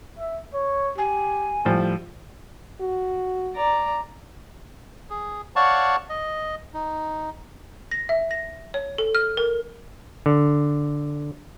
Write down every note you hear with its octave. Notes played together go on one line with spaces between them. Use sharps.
E5
C#5
G4 G#5
A2 F3 G3
F#4
D5 A#5
G#4
C#5 D5 F5 F#5 A5 C#6
D#5
D#4
A#6
E5
A#6
C#5
A4
F6
A#4
D3